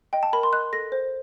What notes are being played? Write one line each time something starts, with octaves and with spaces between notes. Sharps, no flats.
D#5 G5
A5
A#4 B5
C6
D#5 F#6
A4 A#6
C5